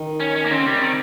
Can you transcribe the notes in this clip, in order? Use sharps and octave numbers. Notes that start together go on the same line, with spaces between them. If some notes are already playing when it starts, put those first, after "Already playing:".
Already playing: D#3
C#4
C#4
A#3
C#3 C4
C3 G3
D#3